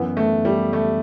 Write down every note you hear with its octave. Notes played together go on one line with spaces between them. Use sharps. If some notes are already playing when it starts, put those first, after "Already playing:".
Already playing: F#2 E3 B3
A3
G3
A3